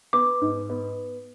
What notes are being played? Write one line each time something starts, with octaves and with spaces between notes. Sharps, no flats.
B3 D6
G#2
B3